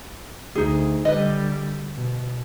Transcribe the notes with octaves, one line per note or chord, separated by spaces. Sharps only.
D2 D#4 G#4
D3 G3 B4 D#5
B2